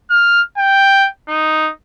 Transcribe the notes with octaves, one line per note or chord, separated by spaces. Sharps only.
F6
G5
D#4